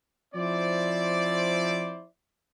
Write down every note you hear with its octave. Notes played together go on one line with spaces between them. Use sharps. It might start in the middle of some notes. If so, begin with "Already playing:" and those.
F3 C4 E4 C5 D5